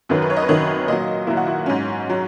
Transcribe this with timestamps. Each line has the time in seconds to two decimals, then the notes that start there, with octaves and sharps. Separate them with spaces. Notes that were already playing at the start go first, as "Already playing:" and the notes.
0.09 F#2 D#3 F#3 B4
0.22 B4
0.30 C#5
0.36 D#5
0.42 B4
0.48 F#2 D#3 F#3 C#5
0.87 A#2 F#3 D#5
1.26 A#2 F#3 E4
1.37 F#4
1.47 E4
1.66 G#2 F#3 C#4
2.09 F#3